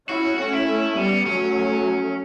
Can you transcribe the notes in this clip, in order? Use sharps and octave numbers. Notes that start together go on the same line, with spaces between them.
C#4 E4 F#4
A3 C#4 F#4
E4
A3 C#4
G3 B3 C#4
F#3 A3 C#4